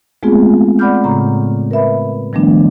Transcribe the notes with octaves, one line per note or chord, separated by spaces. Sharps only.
G#3 A3 B3 C4 F4 G#4
D5 F#5 B5 D6 F6 G6
A2 C#3 A#5
A#4 B4 E5 B5
D#3 F3 G3 A3 B3 D4